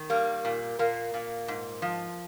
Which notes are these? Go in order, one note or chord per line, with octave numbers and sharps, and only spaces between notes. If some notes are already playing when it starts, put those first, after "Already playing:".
Already playing: D#3
G3 A#3
A#2
A#2 A#3
A#2
G#2
F3